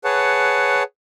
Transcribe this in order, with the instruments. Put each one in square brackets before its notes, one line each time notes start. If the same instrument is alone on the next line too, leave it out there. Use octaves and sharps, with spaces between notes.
[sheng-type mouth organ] G#4 B4 C#5 F#5 A5